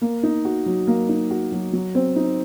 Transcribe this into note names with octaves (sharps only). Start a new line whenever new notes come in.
A#3
D#4
F#4
F#3
A#3
D#4
F#4
F#3
F#3
C4
D#4